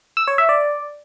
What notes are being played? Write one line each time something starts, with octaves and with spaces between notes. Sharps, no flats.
E6
C#5
E5
D5